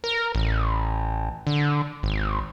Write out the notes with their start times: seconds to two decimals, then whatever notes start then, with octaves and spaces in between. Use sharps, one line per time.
0.04 A#4
0.35 A1
1.47 D3
2.03 G#1